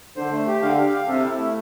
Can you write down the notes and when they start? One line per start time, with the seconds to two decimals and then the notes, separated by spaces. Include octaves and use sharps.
0.16 D3 C5
0.31 A3
0.47 G4
0.62 D3 F5
0.77 G4
0.93 F5
1.08 C3 A4
1.23 E4
1.38 A3